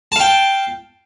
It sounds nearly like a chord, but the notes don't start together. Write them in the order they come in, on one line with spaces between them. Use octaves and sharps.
A5 F5 G5